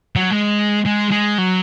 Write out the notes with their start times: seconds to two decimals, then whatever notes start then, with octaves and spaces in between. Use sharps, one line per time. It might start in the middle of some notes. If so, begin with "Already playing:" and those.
0.16 F#3
0.31 G#3
0.85 G#3
1.11 G#3
1.38 F#3